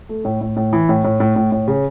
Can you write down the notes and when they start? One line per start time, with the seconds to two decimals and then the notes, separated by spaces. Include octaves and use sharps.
0.09 A3
0.25 A2
0.41 A2
0.56 A2
0.73 E3
0.89 A2
1.04 A2
1.20 A2
1.36 A2
1.52 A2
1.68 C#3